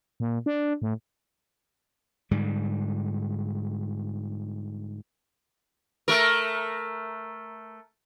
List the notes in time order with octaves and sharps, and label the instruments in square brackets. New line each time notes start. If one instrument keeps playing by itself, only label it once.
[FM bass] A#2
D4
A2
[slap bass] G#2 D3 G3
[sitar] A3 A#4